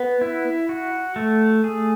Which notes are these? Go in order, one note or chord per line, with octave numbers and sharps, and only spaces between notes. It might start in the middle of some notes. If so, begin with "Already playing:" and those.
Already playing: B3
E4
F#4
A3
G#4